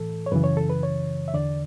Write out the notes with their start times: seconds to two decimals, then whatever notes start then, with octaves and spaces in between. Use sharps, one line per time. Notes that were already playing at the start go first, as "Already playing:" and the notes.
Already playing: A2 E3 A4
0.26 C#5
0.32 F#2 C#3 E3 B4
0.44 C#5
0.57 A4
0.70 B4
0.83 C#5
1.28 E5
1.34 E2 D3 D5